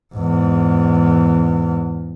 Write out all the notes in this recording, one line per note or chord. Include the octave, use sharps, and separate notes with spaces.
E2 G#2